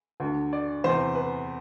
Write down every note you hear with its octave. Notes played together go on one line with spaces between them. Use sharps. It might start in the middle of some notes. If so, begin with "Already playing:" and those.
D2 D3
D5
E2 C3 E3 C5
B4